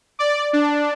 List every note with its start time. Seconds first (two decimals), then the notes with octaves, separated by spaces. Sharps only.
0.19 D5
0.53 D4